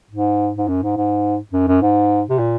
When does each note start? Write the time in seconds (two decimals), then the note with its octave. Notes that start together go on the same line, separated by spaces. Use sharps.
0.11 G#2
0.58 G#2
0.68 F#2
0.82 G#2
0.97 G#2
1.53 F#2
1.67 F#2
1.81 G#2
2.29 C3
2.38 A#2